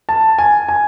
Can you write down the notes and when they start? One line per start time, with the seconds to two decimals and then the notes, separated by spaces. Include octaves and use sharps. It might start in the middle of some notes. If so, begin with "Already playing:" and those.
0.09 A5
0.38 G#5
0.69 G#5